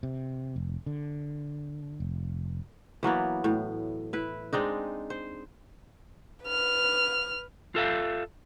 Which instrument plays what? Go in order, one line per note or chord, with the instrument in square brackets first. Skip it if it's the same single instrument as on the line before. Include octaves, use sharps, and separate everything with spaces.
[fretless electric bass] C3
F1
D3
F1
[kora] E3 F#3 A#3 B3
A2
E4 B4
G#3 C4 D4 D#4
C5
[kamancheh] B4 F6
[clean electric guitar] F4 A4 E5 F5